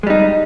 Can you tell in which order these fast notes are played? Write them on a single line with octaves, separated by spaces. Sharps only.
G#3 G3 D#4